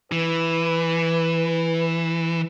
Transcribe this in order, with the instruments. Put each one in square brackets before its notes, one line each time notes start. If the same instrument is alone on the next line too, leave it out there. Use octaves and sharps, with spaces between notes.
[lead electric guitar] E3 [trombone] B4